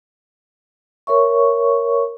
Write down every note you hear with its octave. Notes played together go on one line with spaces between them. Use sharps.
A#4 C#5 E5 C#6